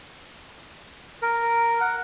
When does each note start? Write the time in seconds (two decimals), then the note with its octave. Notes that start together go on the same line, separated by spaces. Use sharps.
1.22 A#4
1.81 F#5